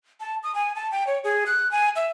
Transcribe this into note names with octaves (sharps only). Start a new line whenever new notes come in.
A5
D#6
G#5
A5
G5
C#5
G#4
F#6
G#5
E5